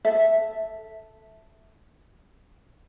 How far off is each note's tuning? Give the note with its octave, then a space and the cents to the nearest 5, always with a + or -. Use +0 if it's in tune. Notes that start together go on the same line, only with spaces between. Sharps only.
A4 +0 E5 +0